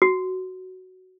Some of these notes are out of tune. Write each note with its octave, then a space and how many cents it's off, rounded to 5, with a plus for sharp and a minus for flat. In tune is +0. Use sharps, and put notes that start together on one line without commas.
F#4 +5